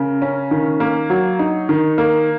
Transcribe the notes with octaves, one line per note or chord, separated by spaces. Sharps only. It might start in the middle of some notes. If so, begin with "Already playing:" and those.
Already playing: C#3 A#4
C#4
D#3
A#3
F#3
D#4
D#3
A#3